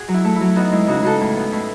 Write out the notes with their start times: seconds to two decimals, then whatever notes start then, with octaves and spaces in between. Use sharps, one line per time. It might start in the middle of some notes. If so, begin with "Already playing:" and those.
Already playing: F#4 G#4
0.08 F#3
0.14 E4
0.25 A3
0.35 E4
0.41 F#3
0.56 B3 D#4 F#4
0.72 G#3 E4
0.87 C#3 D#4 F#4
1.02 C#3 F#4 A4
1.21 A2
1.36 B3
1.52 A2